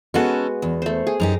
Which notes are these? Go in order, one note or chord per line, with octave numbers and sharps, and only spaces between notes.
G#3 B3 C#4 F#4 A4
E2
A3 C5
G#4
F#2 D#4 G4 A#5